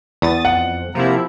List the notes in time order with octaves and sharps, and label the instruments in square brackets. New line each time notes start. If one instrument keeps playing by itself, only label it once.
[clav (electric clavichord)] E2 [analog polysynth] D#6 A6
[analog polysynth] F2 [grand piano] F#5
[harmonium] C3 A#3 A#5 [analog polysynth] F3 E4